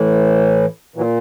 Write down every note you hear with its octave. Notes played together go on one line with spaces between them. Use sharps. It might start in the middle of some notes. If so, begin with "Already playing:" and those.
Already playing: A2 E3
A#2 E3 F#3